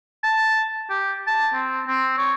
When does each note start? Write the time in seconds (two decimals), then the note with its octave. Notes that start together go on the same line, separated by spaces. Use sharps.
0.24 A5
0.89 G4
1.27 A5
1.54 C4
1.87 C4
2.18 C#5